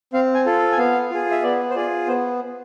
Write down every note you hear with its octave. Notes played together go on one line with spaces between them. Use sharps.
C4 F5
G#5
F4 A4
G#5
B3 F5
F4 G#4
E5
B3 D5
C5
F4 G#4 D5
B3 C5